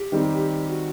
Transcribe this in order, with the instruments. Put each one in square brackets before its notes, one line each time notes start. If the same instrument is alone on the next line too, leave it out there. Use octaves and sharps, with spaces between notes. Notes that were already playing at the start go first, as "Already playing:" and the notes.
Already playing: [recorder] G4
[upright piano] D#3 G3 C4
[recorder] F#4